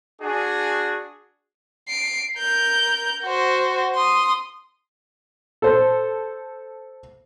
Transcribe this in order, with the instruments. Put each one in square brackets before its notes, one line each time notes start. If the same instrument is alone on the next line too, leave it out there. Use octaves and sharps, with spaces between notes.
[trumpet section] D4 F#4 G#4
[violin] C7 D7
A#4 G6
F#4 C5
C6 D#6
[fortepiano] A4 C5